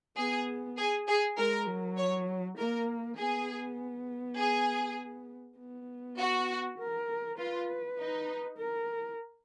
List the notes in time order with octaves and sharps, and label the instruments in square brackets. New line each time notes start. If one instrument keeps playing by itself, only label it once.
[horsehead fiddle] B3 [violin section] G#4
[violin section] G#4
G#4
[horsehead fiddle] G#3 [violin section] A#4
[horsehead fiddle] F#3
[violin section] C#5
[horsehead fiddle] A#3 [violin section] A#4
[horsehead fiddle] B3 [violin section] G#4
[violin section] G#4
[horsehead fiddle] B3
[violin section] F#4
[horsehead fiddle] A#4
[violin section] F4 [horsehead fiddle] B4
[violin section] D#4
[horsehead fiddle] A#4